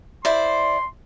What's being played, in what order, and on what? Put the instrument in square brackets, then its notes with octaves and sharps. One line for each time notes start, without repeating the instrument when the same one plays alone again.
[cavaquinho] E4 C5 D5 [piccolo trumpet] C6